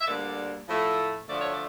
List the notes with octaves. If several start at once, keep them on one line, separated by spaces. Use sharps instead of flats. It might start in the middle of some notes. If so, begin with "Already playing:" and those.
E5
D2 D3 G3 A#3 D5
A2 F3 A3
D2 D3 F3 A3 D5
C#5
D5